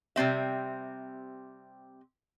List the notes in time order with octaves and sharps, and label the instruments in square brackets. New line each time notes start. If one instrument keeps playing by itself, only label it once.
[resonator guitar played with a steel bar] C3 G3 C4 E5